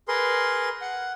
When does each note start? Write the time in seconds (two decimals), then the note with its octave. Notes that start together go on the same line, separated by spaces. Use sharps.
0.08 G#4 A#4 B4 C6
0.81 F#5